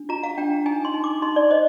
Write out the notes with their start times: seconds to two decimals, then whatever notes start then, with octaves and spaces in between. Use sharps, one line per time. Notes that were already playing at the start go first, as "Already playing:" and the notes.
Already playing: D4
0.09 F4 A#5
0.23 F5
0.38 D4 G5
0.66 D#4 G#5
0.85 C6
0.94 D#4
1.04 D6
1.22 D#4 C6
1.36 D5
1.50 C5 D#5